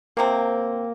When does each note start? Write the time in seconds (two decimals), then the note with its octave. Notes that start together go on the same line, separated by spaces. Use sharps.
0.17 C3 F3 A#3 C4